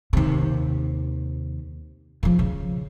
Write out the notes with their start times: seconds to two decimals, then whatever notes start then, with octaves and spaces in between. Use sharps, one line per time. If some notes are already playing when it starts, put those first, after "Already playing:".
0.13 D#2 C3
2.23 C#3 F3
2.39 C#3